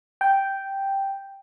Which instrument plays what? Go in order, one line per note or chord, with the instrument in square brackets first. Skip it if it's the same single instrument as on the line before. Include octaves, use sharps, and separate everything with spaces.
[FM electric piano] G5